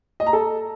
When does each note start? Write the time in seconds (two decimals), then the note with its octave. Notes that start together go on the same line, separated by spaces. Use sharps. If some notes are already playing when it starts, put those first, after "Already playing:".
0.20 D#5
0.26 A#5
0.33 A4